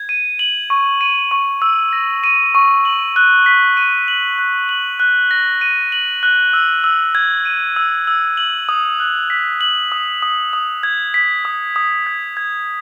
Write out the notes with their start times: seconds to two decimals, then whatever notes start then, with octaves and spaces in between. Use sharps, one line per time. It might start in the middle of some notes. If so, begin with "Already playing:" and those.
Already playing: G#6
0.09 D#7
0.39 F#7
0.70 C#6
1.01 D#7
1.31 C#6
1.62 E6
1.93 A#6
2.24 D#7
2.55 C#6
2.85 F#7
3.16 F#6
3.46 B6
3.77 D#7
4.08 F#7
4.39 F#6
4.69 F#7
5.00 F#6
5.31 A#6
5.61 D#7
5.92 F#7
6.23 F#6
6.53 E6
6.84 E6
7.15 G#6
7.45 D#7
7.76 E6
8.07 E6
8.37 F#7
8.69 D#6
9.00 F#6
9.30 B6
9.61 F#7
9.92 D#6
10.22 D#6
10.53 D#6
10.83 G#6
11.14 B6
11.45 D#6
11.76 D#6
12.07 G#6
12.37 G#6